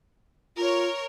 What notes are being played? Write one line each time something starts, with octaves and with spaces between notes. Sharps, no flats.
F4 A#4 C#5